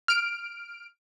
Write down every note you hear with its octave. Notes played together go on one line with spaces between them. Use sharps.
F6 D7